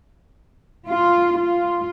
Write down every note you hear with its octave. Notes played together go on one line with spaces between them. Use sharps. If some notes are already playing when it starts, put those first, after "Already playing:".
F4
F4